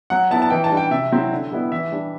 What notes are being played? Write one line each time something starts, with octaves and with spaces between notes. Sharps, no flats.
F#3 F#5
B3 E4 A5
A5
E3 G5
A5
G3 D4
G5
C3 E5
F#3 C4 E4
D3
G3 B3 E4
E3 E5
G3 D4